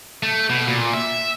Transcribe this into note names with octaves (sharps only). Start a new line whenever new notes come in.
A3
B2
A#2
E5